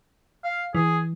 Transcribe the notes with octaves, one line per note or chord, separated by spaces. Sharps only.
F5
E3 G#4